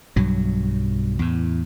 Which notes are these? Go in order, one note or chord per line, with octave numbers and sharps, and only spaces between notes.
B1 G2 F#3
E2 A2